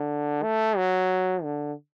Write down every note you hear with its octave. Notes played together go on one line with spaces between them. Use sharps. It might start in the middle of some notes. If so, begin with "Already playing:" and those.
Already playing: D3
A3
F#3
D3